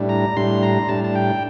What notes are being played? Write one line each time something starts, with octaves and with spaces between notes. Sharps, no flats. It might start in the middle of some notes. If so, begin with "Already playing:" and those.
Already playing: A2 G3 D4
A#5
A2 G3 D4 C6
A#5
A2 G3 D4 A5
A5
G5